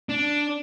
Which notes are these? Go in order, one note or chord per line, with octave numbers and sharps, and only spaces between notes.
D4